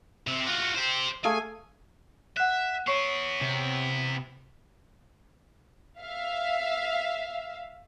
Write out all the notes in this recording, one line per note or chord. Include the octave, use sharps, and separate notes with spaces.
C3 C4
F4 F#4
G4 C5
A3 G#4 F5 G#5
E5 F#5 F#6
B3 E4 C#5 C#6 C7
C3
E5 F5